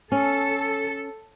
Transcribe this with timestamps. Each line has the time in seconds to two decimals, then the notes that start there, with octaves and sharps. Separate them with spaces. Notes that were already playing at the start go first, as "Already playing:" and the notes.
0.12 C#4 A4